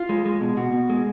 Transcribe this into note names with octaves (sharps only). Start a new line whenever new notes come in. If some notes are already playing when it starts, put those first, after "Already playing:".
Already playing: F4
G#3
G#3
B2
B2 F#4
B2
G#3